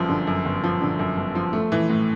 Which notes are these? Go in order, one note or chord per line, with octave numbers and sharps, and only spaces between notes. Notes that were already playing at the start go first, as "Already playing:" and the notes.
Already playing: G1 F#2 F3
D3
F#2
G1
F3
D3
F#2
G1
F3
A3
E3
A2